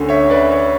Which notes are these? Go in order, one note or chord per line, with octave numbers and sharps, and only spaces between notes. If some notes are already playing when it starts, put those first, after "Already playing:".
Already playing: D2 D3 A3 C#4
C#5 E5
B4 D5
C#5